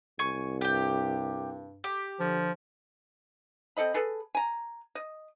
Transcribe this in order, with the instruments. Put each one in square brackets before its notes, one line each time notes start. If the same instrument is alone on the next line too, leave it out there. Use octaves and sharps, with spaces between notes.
[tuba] C2 [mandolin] G#5 C#6
[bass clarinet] G2 [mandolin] G4 G5
[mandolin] G4
[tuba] D3 [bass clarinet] F3
[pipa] C4 A4 D#5 B5
G#4 A4 B4
G#5 A#5
D#5